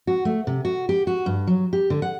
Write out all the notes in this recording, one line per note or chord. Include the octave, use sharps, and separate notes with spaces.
F#4
A3
C3
F#4
G4
F#4
G2
F#3
G4
D3
F#5